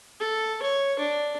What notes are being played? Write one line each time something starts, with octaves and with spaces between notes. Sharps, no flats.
A4
C#5
D4